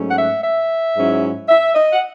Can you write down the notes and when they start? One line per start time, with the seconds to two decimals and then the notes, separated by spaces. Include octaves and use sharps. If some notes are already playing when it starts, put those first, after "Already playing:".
Already playing: G#2 F#3 A3 C#4
0.11 F#5
0.18 E5
0.44 E5
0.97 G#2 F#3 C#4 E4
1.49 E5
1.74 D#5
1.93 F#5